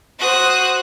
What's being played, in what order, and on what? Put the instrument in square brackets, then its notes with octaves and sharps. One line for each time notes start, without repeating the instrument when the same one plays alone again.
[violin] F#4 C5 [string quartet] D#6 F#6